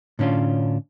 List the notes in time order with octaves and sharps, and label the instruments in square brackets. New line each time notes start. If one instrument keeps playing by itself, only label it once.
[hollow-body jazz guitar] A2 D3 C#4 D4 F4